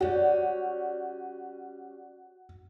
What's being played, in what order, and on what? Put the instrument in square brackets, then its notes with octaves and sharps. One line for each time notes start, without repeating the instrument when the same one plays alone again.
[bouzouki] G3 C#4 [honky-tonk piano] F#4